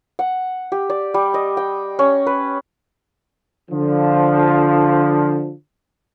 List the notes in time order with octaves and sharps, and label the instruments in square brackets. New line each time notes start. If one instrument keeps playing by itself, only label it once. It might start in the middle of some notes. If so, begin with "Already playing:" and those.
[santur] F#5
G4
D5
G3
D#5
G5
C#4
B4
[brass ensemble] D3 F3